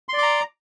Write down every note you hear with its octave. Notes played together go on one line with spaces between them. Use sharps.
D5 A#5 C6 D6